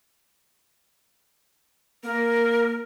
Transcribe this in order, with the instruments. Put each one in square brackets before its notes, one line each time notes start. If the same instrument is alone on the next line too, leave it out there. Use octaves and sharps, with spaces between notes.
[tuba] A#3 [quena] A#4